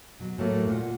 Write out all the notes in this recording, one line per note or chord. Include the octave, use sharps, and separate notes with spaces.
B2 F#3
A2 F#3 A3 A#3
A#2 F4 F#5